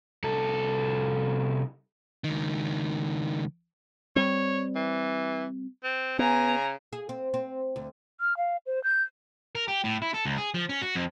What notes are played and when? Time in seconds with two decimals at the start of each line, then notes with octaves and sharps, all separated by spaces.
0.24 C2 A4
2.24 C#2 D#3
4.16 G3 C4 C#5
4.75 E3
5.84 C4
6.19 C#3 B3 G#5 A#5
6.93 G#4
7.09 C4
7.34 C4
7.76 D2
8.20 F6
8.37 F5
8.66 C5
8.84 G6
9.55 A#4
9.68 G4
9.84 A2
10.02 E4
10.14 A4
10.25 C#2
10.38 G#4
10.54 F3
10.69 C#4
10.82 F#4
10.95 F2